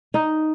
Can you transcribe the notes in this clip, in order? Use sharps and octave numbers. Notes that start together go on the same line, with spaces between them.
D#4